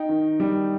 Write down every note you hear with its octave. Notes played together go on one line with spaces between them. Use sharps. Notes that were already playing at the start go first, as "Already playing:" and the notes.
Already playing: D#4 G5
D#3
G3